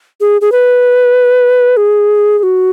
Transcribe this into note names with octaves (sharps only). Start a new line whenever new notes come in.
G#4
G#4
B4
G#4
G#4
F#4